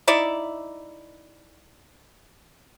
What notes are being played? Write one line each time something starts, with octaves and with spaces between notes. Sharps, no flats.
D#4 E4 D5 E5